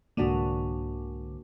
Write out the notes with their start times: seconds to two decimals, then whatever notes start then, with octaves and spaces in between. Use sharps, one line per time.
0.17 C2 G#2 D3 A#3 D4 F#4